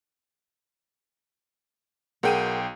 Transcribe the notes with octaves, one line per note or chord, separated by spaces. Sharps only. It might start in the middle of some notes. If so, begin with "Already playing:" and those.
B1 G#4 A#4 F#5 G5 D#7